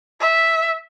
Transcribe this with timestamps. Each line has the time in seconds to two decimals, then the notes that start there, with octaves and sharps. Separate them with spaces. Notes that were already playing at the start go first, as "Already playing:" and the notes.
0.21 E5